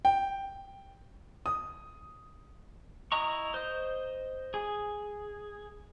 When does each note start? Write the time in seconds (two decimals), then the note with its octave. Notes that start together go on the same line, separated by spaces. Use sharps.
0.05 G5
1.46 D#6
3.12 E4 D#5 A#5 C#6
3.54 C5 D#5
4.54 G#4